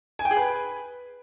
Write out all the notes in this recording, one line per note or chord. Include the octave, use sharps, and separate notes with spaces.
G#5
G5
G#4
B4